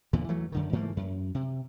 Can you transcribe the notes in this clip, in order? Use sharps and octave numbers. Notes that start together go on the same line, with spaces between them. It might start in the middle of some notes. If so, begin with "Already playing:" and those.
E2 A#2 D3
E3 F#3 A3
F#2 D3 D#3
G#2 E3 A3 A#3
F#2
C3